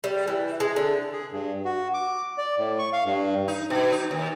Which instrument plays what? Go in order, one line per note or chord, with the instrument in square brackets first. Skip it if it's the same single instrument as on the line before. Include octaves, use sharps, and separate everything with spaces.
[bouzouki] G3
E3
G#3
D3
[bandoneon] G#4
G2
F#4
D6
D5
A2
C#6
F5
G2
[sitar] D#4
B2
D#4
D#2